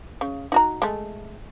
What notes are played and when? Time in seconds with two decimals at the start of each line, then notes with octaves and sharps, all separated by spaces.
0.21 C#3
0.52 D#4 F#4 A#5
0.82 G#3 A3